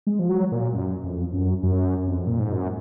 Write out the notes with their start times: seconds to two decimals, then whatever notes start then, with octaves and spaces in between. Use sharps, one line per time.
0.07 G#3
0.19 F3
0.29 F#3
0.52 A#2
0.74 F#2
1.04 F2
1.33 F#2
1.63 F#2
2.08 F2
2.27 A#2
2.39 G#2
2.52 F#2